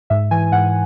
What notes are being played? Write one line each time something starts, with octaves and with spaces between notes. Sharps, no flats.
G#2 E5
E3 G#5
G#2 F#5